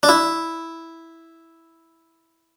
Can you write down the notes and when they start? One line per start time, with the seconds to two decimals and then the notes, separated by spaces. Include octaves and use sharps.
0.03 D4
0.09 E4